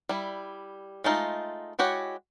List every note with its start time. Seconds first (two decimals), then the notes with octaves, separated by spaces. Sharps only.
0.09 G3 E4
1.04 G#3 A3 D#4 F4
1.79 G#3 E4 F#4 G4 C#5